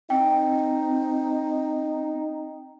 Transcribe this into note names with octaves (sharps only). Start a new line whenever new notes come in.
C4 D#4 G5